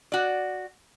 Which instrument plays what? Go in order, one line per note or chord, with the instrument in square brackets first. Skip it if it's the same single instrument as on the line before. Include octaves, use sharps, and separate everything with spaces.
[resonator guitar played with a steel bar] F#4 D5